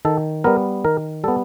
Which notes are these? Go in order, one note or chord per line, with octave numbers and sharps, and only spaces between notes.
D#3 A4
G3 B3 A#4
D#3 A#4
G3 B3 A4